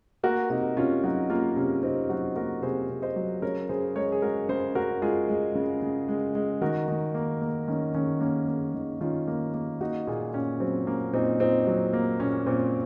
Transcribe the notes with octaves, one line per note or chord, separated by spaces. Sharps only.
A#3 F#4 A#4
C3 D#4 F#4
C3 C#4 F4
F#3 D#4 F#4
A#3 C#4 F4
C3 C#4
C3 C4 D#4
F#3 D#4 F#4
A#3 F#4 A#4
C3 G#4 C5
C3
C5 D#5
F#3
C#3 A#4 C#5
C#3 G#4 C5
G#3 A#4 C#5
G#4
G#3 F#4 A#4
C#3 G#4 C5
C#3 F#4 A#4
G#3 F4 G#4
G#3
C#3
C#3
G#3
G#3
D#3 F#4 A#4
D#3
A#3
A#3
D#3 C#4
D#3 C#4
A#3 C#4
A#3
D#3
D#3 C#4 F4
A#3
A#3
A#3 D#4 F#4
A#2 F4 G#4
A#2 C#4
F#3 C4
A#3 C#4
A#2 C4 D#4
A#2 C4 D#4
F#3
A#3
A#2 C#4
A#2 C4